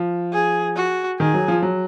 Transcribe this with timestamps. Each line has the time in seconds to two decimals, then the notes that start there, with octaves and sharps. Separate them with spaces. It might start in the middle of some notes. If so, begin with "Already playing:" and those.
Already playing: F3
0.32 G#4
0.76 F#4
1.19 D#3 G#4
1.34 F#3
1.48 F3
1.62 F#3